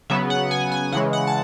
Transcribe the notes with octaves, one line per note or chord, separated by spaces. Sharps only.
C#3 F#3 B3 E5
F#5
G#5
G#5
C#3 E3 G#3 F#5
F#5
A5